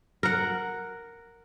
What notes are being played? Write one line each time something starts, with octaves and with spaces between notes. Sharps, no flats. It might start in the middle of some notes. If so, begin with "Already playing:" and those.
A#4 F#5